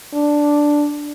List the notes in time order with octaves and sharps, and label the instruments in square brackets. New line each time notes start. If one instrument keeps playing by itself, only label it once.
[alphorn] D4